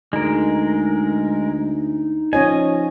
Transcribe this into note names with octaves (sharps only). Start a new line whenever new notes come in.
D2 G#3 D#4 A#4
F3 C#4 C#5 D#5 G#5